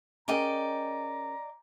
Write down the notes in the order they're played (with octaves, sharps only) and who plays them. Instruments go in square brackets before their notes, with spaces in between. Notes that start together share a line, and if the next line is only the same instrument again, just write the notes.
[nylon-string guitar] C#4 G#4 A#4 [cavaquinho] D5 D#5 G5 [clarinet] A#5